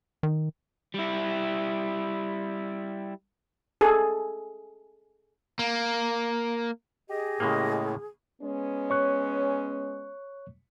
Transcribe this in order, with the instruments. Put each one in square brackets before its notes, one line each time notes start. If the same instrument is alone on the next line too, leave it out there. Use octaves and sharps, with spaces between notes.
[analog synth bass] D#3
[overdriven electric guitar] G3 E4
[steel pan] G#4 A4
[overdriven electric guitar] A#3
[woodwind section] G4 D#5 [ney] G#4
[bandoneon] A2 [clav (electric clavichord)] C#3 G#3 A#3
[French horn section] G#3 B3 C#4
[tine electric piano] C#5 C#6 F#6